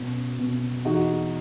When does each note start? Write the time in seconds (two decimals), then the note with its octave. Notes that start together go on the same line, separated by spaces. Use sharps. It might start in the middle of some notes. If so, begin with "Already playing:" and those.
Already playing: F#2 B2
0.39 B2
0.85 E2 D#4 F#4